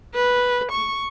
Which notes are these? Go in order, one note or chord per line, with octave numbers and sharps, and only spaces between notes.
B4
C#6